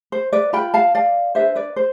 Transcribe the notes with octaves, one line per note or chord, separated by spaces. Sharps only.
C5
B4 D5
F4 B4 G5 B5
F5 A5
D5 F5
D4 G4 B4 C5 E5
B4 D5
C5